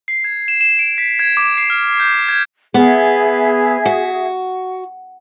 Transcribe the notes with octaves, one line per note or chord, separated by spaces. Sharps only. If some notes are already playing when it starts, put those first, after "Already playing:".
C7
G#6
E7
E7
D7
B6
G#6
D6
C7
F6
G6
G#6
B3 G#4 E5
F#4